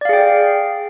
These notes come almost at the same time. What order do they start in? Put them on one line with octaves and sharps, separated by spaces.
D5 F5 G#4 G5